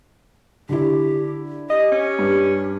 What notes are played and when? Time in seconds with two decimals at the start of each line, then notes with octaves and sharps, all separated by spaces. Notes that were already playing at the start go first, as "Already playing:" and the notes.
0.69 D3 E4 G4
1.70 G4 D#5
1.92 C#4
2.19 G2